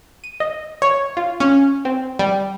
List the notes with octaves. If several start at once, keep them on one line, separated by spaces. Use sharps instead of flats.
D#7
D#5
C#5
F4
C#4
C4
G3